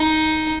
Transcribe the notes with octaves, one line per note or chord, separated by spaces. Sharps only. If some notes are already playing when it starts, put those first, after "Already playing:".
Already playing: D#4